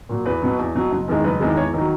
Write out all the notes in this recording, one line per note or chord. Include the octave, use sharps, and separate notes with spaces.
A#2 F#3
E2 B4
B2 F#3
E2
B2 F#3
F#1
E2 D#3 G#3
F#1 B4
E2 D#3 G#3
E2 C#5
D#3 F#3